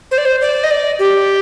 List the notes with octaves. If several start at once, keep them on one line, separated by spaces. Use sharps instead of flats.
C5
D5
C5
D5
D#5
D5
G4